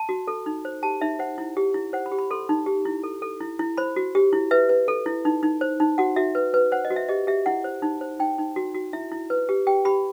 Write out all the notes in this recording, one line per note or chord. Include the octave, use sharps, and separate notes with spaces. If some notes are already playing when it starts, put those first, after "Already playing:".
Already playing: A5
F#4
A4
D#4
C5
G4 A5
D#4 E5
C5 F#5
E4
G4
E4
C5 F#5
B5
G4
B5
A4 C6
D#4
G4
E4
A4
A4
E4
E4
C5 B5
F#4
G4
E4
B4 E5
B4
A4
E4
D#4
D#4
C5
D#4
F#4 F#5
F#4 E5
B4
B4
C5 F#5
D#5
F#4
E5
G4 D#5
G4 E5
E4 F#5
C5
D#4
C5
D#4 G5
D#4
F#4
F#4
E4 E5
E4
B4
G4
G4 G5
G4 B5